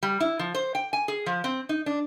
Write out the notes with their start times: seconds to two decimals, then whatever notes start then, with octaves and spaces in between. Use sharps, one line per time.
0.03 G3
0.20 E4
0.39 F3
0.55 C5
0.75 G5
0.93 G#5
1.08 G#4
1.26 F3
1.44 C4
1.69 D#4
1.86 D4